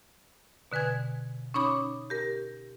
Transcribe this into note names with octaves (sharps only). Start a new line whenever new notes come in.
B2 D3 B4 G#5 G#6
C#4 D#4 C#5 B5 D6 D#6
G4 A#4